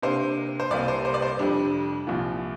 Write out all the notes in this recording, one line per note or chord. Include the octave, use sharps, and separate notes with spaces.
C3 A#3 D4 C5
C5
C2 C3 G3 A#3 D5
C5
C5
D5
C5
F2 C3 G3 D4
C2 A#2 F3